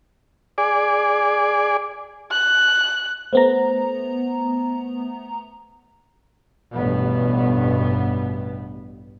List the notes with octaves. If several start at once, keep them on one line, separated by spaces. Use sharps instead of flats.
G#4 D5
F#6
A3 B3 C5 A#5
A1 G2 B2 B3